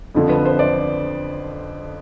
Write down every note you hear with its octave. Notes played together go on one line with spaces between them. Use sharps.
F2 D3 F3
B4
C5
D5